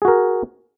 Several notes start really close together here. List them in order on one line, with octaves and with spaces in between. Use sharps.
G#4 F#4 A#4